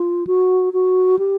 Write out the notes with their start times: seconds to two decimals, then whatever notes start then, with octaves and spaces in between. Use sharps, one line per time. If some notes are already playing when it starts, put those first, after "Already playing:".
Already playing: F4
0.27 F#4
0.73 F#4
1.19 G4